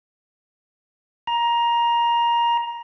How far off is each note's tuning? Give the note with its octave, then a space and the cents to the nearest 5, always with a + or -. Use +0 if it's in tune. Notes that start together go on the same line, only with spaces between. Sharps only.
A#5 +15